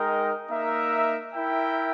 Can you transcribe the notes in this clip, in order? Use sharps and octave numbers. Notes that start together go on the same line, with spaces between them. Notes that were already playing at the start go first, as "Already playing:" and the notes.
Already playing: G#3 D#4 A#4 D#5 G5
A#3 D#4 A#4 E5
E4 A#4 E5 G5